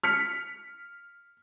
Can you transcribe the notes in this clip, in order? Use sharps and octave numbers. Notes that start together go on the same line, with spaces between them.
F6 B6 C#7